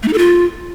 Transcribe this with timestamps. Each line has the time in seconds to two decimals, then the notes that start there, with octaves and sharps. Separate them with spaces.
0.03 A3
0.08 D#4
0.13 A4
0.18 F4